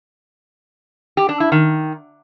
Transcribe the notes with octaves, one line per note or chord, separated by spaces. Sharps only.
G4
D4
E4
D#3